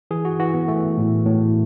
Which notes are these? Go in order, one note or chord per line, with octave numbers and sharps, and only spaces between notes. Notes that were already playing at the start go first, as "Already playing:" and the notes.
E3 G#4
F#4
E3 F#4
B3
E3 A3
A2
A2